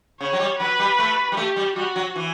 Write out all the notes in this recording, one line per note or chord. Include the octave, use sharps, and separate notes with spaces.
C#3 C#5
F#3
G3
F#3 B4
G3
A3
G3
A3 G4
G3
G3 F#4
F#3
E3